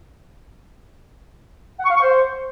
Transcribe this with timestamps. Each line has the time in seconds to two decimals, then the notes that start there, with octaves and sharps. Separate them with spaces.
1.79 F#5
1.85 C#6
1.90 F5
1.96 C#6
2.01 C5